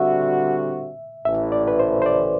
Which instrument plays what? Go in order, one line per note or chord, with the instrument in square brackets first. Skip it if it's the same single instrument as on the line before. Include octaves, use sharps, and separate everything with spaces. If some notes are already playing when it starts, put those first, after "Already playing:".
Already playing: [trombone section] D3 G3 C4 F#4 [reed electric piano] E5
[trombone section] A1 A2 E3 A3 [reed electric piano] E5
[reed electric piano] D5
B4
C5
C5
D5